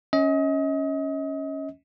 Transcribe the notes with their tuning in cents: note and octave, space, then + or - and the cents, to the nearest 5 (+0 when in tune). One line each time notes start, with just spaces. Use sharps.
C#4 +0 D#5 +35